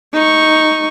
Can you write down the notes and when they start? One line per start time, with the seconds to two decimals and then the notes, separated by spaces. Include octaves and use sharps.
0.14 D#4 C#6